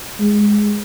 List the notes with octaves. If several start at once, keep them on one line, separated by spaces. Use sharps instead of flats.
G#3